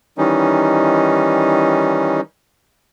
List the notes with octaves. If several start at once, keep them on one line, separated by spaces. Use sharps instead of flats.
D#3 E3 G3 C#4 D#4